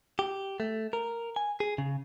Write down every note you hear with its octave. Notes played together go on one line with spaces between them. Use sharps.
G4
A3
A#4
G#5
G#4
C#3